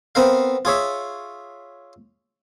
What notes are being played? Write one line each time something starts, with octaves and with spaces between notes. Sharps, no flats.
B3 C4 A#4 F5
F4 G#4 C#5 E5